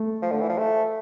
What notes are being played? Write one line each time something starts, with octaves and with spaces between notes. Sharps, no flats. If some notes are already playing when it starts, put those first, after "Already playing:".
Already playing: A3
F3
D3
E3
F3
A3